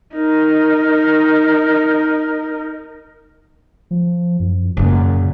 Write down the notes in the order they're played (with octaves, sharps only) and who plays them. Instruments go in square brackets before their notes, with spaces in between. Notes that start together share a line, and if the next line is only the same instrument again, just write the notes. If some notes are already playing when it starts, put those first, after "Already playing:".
[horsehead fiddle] D#4 A#4
[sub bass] F3
F#2
[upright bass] F#2 A#2 [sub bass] C#3